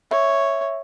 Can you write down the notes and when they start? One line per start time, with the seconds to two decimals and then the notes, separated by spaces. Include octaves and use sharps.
0.11 C#5 E5